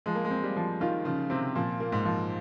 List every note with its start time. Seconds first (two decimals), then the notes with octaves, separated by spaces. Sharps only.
0.06 F3 G#3
0.15 A#3
0.25 G#3
0.30 C4
0.44 G3
0.56 F3
0.81 D#3 F4
1.05 C#3 F3
1.30 C3 C4
1.55 A#2 F3
1.80 A#3
1.92 G#2
2.05 F3